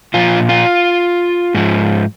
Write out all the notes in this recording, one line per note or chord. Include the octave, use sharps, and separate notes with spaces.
A#2 F3 F4
F4
G#2 F3